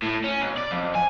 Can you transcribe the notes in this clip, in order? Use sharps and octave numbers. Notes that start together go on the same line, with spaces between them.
A2
C#4
B1
D5
F2
G#5